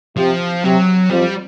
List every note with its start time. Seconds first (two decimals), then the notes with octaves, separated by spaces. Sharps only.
0.17 C3 F3
0.64 C3 F#3
1.10 F2 F3 G3